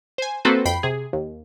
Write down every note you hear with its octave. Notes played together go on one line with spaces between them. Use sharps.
C5 G#5
A#3 C4 F#4 A4 B4 C5
F2 G5 B5 C7
C3 G#4
D#2